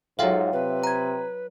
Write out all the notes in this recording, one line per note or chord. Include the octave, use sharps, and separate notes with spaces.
G#2 F#3 F4 A4 E5 F5 G5
C3 B4
A#5 G#6